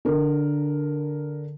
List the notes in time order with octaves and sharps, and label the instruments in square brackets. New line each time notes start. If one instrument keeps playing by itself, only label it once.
[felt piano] D3 A#4